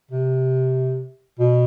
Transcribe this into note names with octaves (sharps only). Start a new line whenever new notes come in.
C3
B2